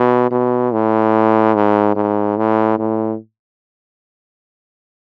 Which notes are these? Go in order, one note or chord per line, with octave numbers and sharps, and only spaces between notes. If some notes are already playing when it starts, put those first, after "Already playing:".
Already playing: B2
B2
A2
G#2
G#2
A2
A2